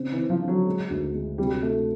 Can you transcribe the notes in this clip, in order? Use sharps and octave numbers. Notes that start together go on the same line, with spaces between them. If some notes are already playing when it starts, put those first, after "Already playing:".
Already playing: C#3 C4
E3
C4
F3
D3
F#3
G#3
D2
G#3
C3 G3
A3